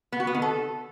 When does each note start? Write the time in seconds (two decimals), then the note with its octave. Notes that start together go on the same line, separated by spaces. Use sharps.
0.12 B3
0.20 F#4
0.27 B3
0.35 D#3
0.42 A4